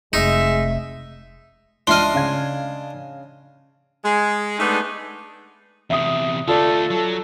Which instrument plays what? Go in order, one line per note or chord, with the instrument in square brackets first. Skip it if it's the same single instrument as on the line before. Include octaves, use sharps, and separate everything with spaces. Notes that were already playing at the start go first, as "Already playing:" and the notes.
[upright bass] F1 [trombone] G#3 [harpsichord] D#4 [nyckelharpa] E5
[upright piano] C#2 E5 C7 [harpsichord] D4 D#5 [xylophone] C6 F6
[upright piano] C#3 F5 G#6
[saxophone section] G#3 G#4
G#3 A3 B3 D4 D#4 G#4
[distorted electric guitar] E2 C3 [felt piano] E5 D#6
[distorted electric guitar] D3 A3 [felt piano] F4 D5 [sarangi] A4
[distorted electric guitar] F#3